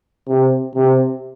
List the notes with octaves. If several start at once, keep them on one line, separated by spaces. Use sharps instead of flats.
C3
C3